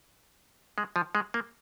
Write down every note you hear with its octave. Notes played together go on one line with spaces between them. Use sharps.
G#3
F3
G#3
A#3